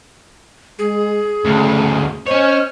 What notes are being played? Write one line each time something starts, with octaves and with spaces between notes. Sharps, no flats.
G#3 G#4
D2 C#3 A3
C#4 C5 C#5 D#5